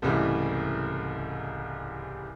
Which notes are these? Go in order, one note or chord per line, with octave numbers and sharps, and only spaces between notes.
C2 G#2 C#3 E3 G3 A3